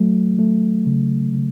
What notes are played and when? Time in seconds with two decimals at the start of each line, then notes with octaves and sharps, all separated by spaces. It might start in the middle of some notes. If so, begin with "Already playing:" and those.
Already playing: F#3 A3
0.39 A3
0.86 C#3
1.34 C#3